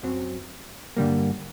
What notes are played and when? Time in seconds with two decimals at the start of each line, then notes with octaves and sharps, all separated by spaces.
0.03 F#2 F#3 C4
0.97 G2 D3 G3 A#3